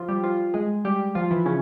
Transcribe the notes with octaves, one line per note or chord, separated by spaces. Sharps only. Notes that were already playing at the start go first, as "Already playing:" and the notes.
Already playing: F3 F4
G3 G4
F3 F4
G#3 G#4
G3 G4
F3 F4
E3 E4
C#3 C#4